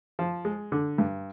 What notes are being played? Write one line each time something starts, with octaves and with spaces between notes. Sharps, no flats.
F3
G#3
D3
G2